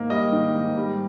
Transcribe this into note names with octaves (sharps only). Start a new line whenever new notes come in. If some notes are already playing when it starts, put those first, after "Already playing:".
Already playing: G#2 D#3 A#3
G3 D#5
D#3
G#2
G3